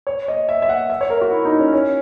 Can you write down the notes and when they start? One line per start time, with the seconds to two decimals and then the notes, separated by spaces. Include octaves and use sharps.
0.07 C#5
0.28 D#5
0.49 E5
0.62 E5
0.69 F#5
0.90 E5
1.01 C#5
1.10 A#4
1.21 F#4
1.31 E4
1.45 D#4
1.59 C#4
1.73 C#4